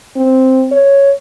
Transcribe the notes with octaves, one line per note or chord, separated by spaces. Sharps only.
C4
C#5